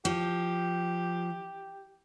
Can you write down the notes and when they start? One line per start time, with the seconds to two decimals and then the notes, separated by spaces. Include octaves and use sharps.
0.05 F3 G4